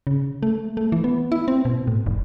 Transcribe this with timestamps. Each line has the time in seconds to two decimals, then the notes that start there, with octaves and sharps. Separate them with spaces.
0.07 C#3
0.43 A3
0.77 A3
0.92 E3
1.04 B3
1.32 E4
1.48 C4
1.65 B2
1.87 A2
2.06 F1